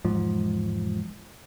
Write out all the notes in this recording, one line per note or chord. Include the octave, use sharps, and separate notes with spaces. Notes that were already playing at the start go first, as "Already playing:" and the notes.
E1 G#2 F3